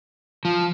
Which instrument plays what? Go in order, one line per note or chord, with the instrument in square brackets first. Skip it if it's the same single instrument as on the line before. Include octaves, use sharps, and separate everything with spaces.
[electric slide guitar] F3